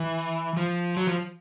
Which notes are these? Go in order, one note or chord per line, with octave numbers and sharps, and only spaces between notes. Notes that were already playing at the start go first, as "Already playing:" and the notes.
Already playing: E3
F3
F#3
F3